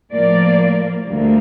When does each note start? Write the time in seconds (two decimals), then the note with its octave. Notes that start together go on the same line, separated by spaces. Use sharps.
0.14 A2 F3 A#3 D5
1.07 D2 D3 G3 A#3